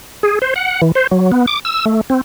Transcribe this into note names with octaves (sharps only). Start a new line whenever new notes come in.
G#4
C5
F#5
E3
C5
F#3
B3
D6
E6
A3
C4